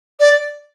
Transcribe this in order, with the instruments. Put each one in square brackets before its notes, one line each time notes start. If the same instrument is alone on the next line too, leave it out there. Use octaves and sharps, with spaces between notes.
[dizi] D5